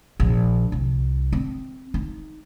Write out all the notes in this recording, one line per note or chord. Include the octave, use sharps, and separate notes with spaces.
A#1
C2
C4
D#4